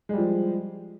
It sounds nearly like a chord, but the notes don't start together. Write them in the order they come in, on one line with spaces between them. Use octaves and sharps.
G#3 G3 F3